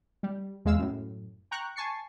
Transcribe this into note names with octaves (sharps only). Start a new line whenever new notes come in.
G3
E2 G#3 F5 E6
F#2 A2
G5 A#5 C#6 F#6
G#5 A5 C#6 A6 C7 C#7